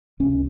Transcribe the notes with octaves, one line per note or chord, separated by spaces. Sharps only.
C#2 C3 C#4